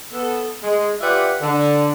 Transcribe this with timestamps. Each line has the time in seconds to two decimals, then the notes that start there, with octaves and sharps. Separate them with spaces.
0.13 B3 A4
0.63 G#3
1.01 F4 G4 B4 D5 E5 F#5
1.41 D3